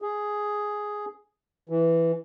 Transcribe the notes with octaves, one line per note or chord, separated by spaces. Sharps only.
G#4
E3